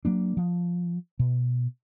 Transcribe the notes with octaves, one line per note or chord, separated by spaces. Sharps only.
F#3 A#3 D4
F3
B2